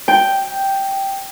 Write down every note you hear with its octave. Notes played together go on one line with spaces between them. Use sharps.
G5